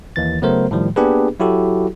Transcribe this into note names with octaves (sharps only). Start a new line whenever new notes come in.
D#2 E3 A6
C#3 F#3 A3 B3 A#4 C5
A2 D#3 F3 G3
A#3 B3 D4 G4 G#4 B4
F#3 E4 F#4 G4 A4